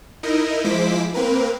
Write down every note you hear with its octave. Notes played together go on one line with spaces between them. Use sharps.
D#4 E4 A#4 D#5
F3 G#3 E4 C5 D6 B6
A#3 C4 A#4 B4